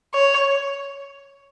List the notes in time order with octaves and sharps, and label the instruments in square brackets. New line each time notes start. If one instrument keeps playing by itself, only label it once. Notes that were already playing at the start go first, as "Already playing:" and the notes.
[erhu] C#5